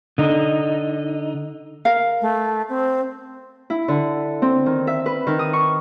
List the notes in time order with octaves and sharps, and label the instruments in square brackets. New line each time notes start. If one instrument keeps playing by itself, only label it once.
[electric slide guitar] D3 D#4
[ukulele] A#4 F5
[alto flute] A3
C4
[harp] E4
D3
C4
D#3
E5
B4
D#3
D#6
C#6